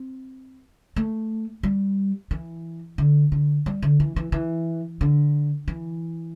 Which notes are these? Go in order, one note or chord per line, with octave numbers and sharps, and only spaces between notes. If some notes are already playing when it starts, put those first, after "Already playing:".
Already playing: C4
A3
G3
E3
D3
D3
G3
D3
E3
E3
E3
D3
E3